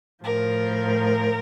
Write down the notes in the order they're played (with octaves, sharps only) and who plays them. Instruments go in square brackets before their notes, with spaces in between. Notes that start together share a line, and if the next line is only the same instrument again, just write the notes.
[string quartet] A2 F3 A#4